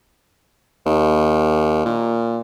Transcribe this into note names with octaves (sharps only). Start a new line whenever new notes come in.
D#2
A#2